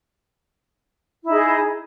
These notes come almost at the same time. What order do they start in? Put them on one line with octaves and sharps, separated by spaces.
E4 D#4 G#4